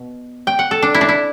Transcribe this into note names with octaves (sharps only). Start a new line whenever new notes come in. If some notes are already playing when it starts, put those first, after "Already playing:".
Already playing: B2
G5
F#5
A4
D4
E4
D4
E4